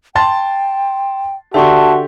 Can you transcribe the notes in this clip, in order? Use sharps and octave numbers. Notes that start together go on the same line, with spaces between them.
G5 A5 C6 A6
D3 F#4 G4 D5 E5 A5 C6 C#6